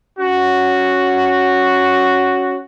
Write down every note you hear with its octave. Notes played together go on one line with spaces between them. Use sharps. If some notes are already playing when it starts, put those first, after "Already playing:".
C#4 F#4